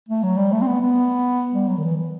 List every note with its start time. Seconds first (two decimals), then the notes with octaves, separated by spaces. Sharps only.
0.09 A3
0.23 F#3
0.37 G3
0.52 A3
0.61 C4
0.67 B3
0.81 B3
1.53 G3
1.68 F#3
1.78 D#3
1.83 E3
1.97 E3